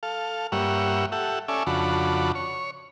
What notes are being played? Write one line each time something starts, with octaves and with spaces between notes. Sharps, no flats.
A4 F5
G2 G3 A#3 C#5 E5 F#5
G4 A4 E5 F#5
C#4 A4 D5 E5 G#5
F2 C#3 D4 F#4 A5 B5
C#5